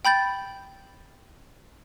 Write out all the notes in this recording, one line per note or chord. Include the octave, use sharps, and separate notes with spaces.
G5 B5 G6 A6